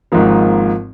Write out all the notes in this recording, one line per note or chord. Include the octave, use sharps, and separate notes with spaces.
G#1 G#2 F3 A#3